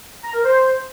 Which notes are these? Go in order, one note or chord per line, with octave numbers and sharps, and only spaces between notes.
A#5
A#4
C5